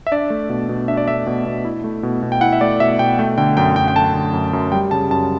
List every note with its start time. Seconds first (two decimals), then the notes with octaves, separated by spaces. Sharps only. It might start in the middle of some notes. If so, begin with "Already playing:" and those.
0.07 E5
0.12 D4 D5
0.30 A3
0.49 B2
0.69 B2
0.88 D4 E5
0.97 D5
1.07 A3 E5
1.27 B2
1.46 B2
1.65 E4
1.84 A3
2.03 B2
2.23 B2
2.32 G5
2.41 E4 F#5
2.53 E5
2.61 A3 D5
2.80 B2 E5
2.99 B2 G5
3.19 A3 G5
3.38 D3 G5
3.57 F#2 G5
3.76 F#2 G5
3.88 G5
3.96 A3 A5
4.14 D3
4.33 F#2
4.53 F#2
4.72 G3 G5
4.91 C#3 A5
5.11 F#2 A5